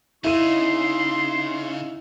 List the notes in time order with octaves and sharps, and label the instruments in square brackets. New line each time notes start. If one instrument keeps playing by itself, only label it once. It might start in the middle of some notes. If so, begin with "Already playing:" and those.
[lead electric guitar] C#3 [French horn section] D#4 [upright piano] E4 D#7 [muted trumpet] C6